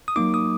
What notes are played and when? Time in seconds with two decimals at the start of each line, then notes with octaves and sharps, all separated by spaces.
0.08 D#6
0.16 F#3 A#3 D#4 D6
0.34 D#6